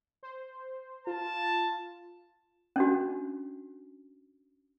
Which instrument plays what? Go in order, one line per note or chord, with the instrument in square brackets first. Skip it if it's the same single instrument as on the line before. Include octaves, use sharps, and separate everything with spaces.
[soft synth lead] C5
[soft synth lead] F4 [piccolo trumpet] A5
[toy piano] C#4 D4 F#4